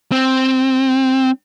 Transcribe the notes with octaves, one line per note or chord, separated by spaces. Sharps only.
C4